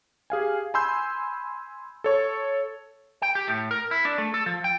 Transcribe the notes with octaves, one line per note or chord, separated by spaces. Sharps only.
G4 G#4 F5 G#5
G#5 B5 C6 E6 G6
A4 C#5 C#6
G5
G4
A2
A#4
E4
D4
A3
A4
F3
G5